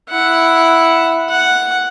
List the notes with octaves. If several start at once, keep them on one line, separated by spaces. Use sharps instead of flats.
E4 F#5
F#5